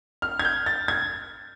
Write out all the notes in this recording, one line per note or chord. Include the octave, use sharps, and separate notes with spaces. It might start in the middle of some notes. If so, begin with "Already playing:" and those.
F6
G#6
G6
A6
G#6